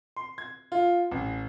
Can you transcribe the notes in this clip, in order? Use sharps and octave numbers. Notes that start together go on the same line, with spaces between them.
C6
G#6
F4
A1